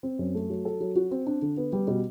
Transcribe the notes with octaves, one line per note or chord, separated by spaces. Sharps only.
C4
F#2
A3
F#3
A4
F#3
F#4
C4
D4
D3
B3
G3
B2